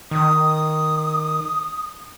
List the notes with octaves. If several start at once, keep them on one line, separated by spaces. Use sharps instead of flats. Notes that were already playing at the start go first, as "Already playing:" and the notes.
D#3 D#6